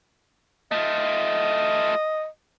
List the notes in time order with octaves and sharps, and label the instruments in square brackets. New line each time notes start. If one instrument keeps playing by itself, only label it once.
[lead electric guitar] A3 F4 [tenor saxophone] D#5